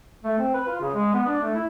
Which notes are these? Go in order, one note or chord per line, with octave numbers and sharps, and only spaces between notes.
A3
C4
B4
F4
C#3
G#3
B3
D4
A3
E4